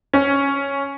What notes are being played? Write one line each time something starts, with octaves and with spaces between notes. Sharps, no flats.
C#4